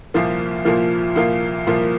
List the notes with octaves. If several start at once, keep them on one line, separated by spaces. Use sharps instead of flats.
C2 A#2 F3 A#3 F4
C2 A#2 F3 A#3 F4
C2 A#2 F3 A#3 F4
C2 A#2 F3 A#3 F4